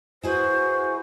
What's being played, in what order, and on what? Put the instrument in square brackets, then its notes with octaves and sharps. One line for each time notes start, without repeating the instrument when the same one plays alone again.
[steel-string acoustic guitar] E4 G#4 B4 [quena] F#4 [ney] C5